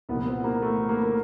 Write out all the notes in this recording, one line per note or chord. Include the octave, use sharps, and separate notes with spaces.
C2 A#2 F3 B3
B3
C4
A#3
A3
A#3
A#3